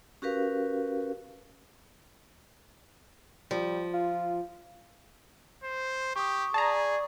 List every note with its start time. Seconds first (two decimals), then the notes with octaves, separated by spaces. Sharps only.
0.22 C#4 F#4 G4 A#4 B4 F5
3.51 F3 G3
3.94 F4
5.64 C5
6.16 G4 C#6 D#6
6.54 G#4 D5 A5 A#5